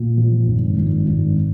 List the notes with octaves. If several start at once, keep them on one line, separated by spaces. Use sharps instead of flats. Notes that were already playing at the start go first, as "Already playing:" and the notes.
Already playing: A#2
F3
G#1
G#1
G#1